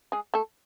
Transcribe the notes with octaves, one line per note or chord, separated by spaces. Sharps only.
G#3 G#4
A3 A4